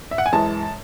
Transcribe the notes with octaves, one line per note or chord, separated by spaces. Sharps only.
E5
F#5
G#5
F#2 E3 G#3 A5